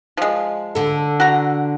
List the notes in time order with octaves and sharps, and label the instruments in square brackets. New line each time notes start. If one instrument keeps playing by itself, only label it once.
[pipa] F3 G#3
[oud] D3 A4
[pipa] F#4 A#5